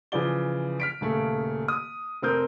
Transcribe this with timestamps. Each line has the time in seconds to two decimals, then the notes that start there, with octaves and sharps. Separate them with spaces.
0.12 C#3 E3 F3 D5 G7
0.80 F6 B6 D7
1.01 D#1 C#3 A3
1.68 D#6
2.22 F1 C4 A#4 D#6 G6